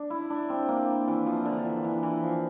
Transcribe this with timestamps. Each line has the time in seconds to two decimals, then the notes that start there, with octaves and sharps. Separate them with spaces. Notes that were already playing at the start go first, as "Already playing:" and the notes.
Already playing: D4
0.10 E4
0.30 D4
0.50 C4
0.68 A#3
1.08 E3
1.26 F3
1.45 D3
1.65 E3
1.84 E3
2.03 E3
2.23 F3